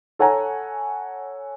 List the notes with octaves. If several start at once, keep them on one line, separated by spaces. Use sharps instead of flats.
A4 C#5 F#5 G#5 A#5